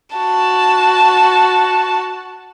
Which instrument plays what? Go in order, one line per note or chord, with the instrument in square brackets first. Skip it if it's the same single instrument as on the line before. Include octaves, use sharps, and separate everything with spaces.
[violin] F#4 A5